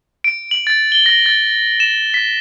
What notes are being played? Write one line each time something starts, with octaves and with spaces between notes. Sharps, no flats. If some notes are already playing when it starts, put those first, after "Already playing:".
D7
F#7
A6
G7
A#6
A6
E7
B6